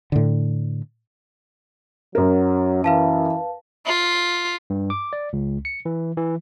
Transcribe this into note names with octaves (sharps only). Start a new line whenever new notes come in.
A2 D3
F#2 F#3 A#4
E3 B4 F5 A5
F4
G2
D6
D5
C#2
C#7
E3
E3